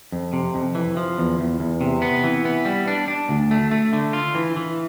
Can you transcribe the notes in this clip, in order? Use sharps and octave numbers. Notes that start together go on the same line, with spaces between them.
F2
C3
F2
E3
F3
E2
E2
E2
C3
B3
E3
B3
G3
D4
D4
D2
A3
A3
D3
F4
E3
E3